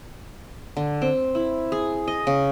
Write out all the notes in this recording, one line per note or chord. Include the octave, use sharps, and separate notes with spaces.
D3
C4
E4
G#4
D#5
C#3